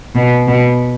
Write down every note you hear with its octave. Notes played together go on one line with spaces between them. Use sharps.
B2
B2